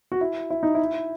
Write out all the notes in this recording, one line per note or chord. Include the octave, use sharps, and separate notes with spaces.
F#4
E4
E4
D#4
E4